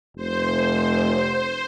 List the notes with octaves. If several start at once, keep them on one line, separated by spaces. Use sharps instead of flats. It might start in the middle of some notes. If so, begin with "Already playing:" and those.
F1 C5